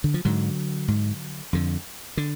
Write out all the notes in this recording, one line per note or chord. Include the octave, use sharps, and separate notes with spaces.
D3
F3
G#2 D3 F#3
G#2
F2 D3
D3